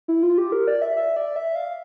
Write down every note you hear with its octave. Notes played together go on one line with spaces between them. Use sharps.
E4
F4
G4
A#4
D5
E5
E5
D5
E5
F5